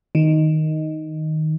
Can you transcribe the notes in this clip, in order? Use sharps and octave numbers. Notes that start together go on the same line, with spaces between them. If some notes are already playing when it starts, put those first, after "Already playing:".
D#3